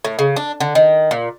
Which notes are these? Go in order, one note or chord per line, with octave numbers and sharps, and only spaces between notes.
A2
C#3
D4
D3
D#3
A#2